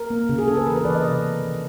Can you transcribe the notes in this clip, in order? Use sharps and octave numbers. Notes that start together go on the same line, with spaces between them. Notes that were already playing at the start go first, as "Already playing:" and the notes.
Already playing: A#4
A#3
C#3
G#4
C#3 A4
B4
E3 A#4
B4
E3 D5
D#5
C3 D5
A#3
D#3